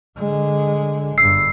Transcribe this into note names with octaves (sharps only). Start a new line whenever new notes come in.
D3 G#3
G1 G2 E6 C7